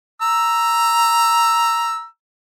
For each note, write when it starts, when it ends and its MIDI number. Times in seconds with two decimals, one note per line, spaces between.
0.22 2.05 82
0.22 2.05 88